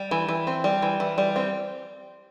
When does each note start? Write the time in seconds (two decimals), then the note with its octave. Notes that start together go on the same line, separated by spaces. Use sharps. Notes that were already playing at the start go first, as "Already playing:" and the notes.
Already playing: G3 G5
0.11 E3
0.29 E3
0.47 C4
0.64 G3
0.82 E3
1.00 E3
1.18 G3
1.36 C4